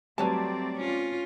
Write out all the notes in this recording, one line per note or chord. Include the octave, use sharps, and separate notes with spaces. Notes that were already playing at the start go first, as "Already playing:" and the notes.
F#3 G3 A3 C4 B4 C#5 D5 A5
C#4 F4